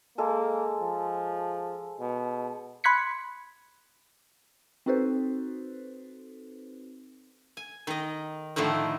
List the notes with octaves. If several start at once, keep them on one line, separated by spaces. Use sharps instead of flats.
G#3 A#3 A4
F3
B2
B5 C6 F#6 G#6 B6 C#7
C4 D#4 F#4 A4 B4 C5
G#5
D#3 D#5
A2 D3 D#3 F3 A3